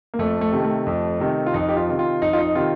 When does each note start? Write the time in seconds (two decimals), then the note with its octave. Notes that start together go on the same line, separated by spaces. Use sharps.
0.14 A#3
0.19 F2 A3
0.41 A3
0.52 C3 D#3
0.64 A3
0.87 F2
1.20 C3 D#3
1.46 F4
1.54 F2 D#4
1.69 G4
1.76 F4
1.88 C3 D#3
1.99 F4
2.22 F2 D#4
2.33 F4
2.38 D#4
2.55 C3 D#3 F4